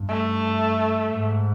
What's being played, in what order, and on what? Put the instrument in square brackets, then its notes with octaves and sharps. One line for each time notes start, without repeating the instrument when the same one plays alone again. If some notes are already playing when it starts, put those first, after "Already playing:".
Already playing: [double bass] G2
[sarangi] A3
[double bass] G#2